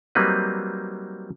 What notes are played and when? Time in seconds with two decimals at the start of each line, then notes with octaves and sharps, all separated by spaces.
0.15 F#3 G3 A#3 C4 D#4 B4